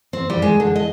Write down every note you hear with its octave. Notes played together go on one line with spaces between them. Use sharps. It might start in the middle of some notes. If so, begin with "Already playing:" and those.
C4
G3
G#3
D3
D#5